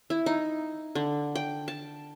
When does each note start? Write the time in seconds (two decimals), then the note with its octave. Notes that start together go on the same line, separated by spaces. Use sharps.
0.10 E4
0.26 D#4
0.95 D3
1.35 G5
1.68 A5